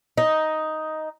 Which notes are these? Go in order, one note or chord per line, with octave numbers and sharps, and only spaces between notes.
D#4